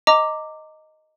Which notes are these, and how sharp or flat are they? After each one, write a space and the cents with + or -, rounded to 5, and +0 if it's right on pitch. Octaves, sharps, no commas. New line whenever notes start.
D#5 +0 A#5 -25 D6 +0